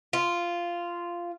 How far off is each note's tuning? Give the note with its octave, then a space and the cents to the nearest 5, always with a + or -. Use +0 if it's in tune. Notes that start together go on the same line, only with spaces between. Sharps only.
F4 -10